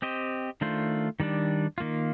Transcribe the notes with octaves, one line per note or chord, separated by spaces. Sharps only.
C4 G4 C5 D#5
D#3 A3 D4 F4 C5
D#3 G3 D4
D#3 A#3 F4